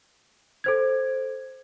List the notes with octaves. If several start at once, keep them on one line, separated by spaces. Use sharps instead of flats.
A4 C5 G#6